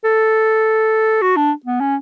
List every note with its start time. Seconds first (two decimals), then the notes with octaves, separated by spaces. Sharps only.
0.04 A4
1.22 F#4
1.37 D4
1.66 B3
1.81 C#4